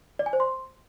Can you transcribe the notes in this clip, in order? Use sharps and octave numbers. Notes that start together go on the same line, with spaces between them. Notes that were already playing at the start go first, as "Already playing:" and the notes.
D5
G#5
C5
C6